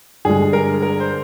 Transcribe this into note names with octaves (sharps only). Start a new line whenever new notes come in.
G2 D3 G#3 G#4
A#4
A#4
C5